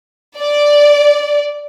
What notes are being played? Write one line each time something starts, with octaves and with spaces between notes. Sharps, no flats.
D5